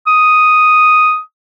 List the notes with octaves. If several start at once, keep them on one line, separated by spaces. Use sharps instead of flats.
D#6